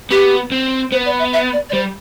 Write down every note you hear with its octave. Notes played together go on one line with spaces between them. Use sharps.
B3 G4
C4
B3 C5
D5
E5
E5
D5
D5
G3 C5